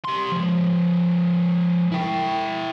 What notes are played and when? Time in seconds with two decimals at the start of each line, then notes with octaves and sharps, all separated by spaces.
0.05 G3 C6
0.32 F3 G#3
1.92 E4 G5